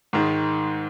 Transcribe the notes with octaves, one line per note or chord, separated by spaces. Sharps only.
G#2 D#3 G#3